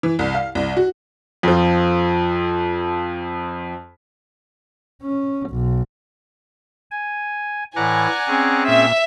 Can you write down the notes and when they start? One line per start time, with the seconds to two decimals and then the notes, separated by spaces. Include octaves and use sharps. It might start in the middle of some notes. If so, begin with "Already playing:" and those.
0.03 E3
0.19 C2
0.34 F5
0.55 C2
0.77 F#4
1.43 F2 F3
5.02 C#4
5.49 B1
6.91 G#5
7.76 A2 E3 D5 F#5 G#5 A#5
8.28 C4 C#4 G#4
8.68 A#2 E5